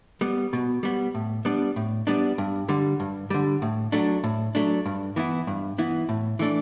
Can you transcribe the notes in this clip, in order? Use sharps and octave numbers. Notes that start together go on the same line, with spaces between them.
G3 B3
B2
G3 B3
A2
G3 B3 D4
A2
G3 B3 D4
G2
D3 G3
G2
D3 G3
A2
F#3 A3 D4
A2
F#3 A3 D4
G2
E3 B3 E4
G2
E3 B3 E4
A2
E3 A3 D4